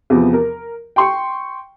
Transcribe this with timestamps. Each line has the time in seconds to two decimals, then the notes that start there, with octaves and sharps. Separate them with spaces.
0.10 E2 C3 F3 B3
0.33 A#4
0.96 G5 C6 C#6